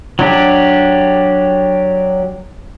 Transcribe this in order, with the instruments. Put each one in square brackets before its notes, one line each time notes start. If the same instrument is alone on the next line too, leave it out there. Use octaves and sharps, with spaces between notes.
[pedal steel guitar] F#3 D4 G4